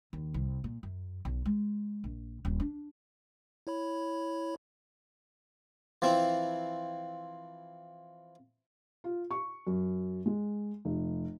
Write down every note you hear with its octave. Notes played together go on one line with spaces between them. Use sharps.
D#2
C2
A#2
F#2
B1
G#3
A#1
D#1
D4
E4 C#5 B5
E3 F3 C4 E4
F4
C#6
F#2
G#3
F1